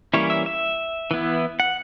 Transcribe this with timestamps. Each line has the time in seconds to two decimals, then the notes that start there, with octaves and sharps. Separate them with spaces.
0.14 E3 G3 A#3 C#4 E4 C#5
0.30 E5
0.46 E5
1.11 E3 B3 E4
1.60 F#5